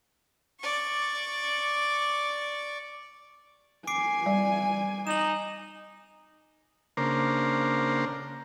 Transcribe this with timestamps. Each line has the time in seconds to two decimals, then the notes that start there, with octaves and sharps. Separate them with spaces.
0.60 D5 C#6
3.87 G#5 D6 C7 D7
4.26 G3 D5
5.07 D#4 E7 F#7
6.97 C#3 A#3 D4 A#4 C5